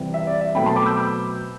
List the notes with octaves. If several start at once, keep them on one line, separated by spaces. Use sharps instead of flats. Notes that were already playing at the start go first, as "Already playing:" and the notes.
Already playing: C3 E3 G3 C4
E5
D5
E5
B2 F#3 A3 C4 G5 B5
A5 C6
B5 D6
E6 G6
B5 D6